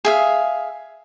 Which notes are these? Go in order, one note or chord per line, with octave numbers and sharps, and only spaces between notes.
G#4 E5 F5